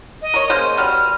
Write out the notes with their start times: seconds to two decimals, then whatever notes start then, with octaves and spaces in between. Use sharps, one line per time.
0.22 D#5
0.34 A#4 C#5
0.50 C#3 A#3 C5
0.77 B2 G3 F6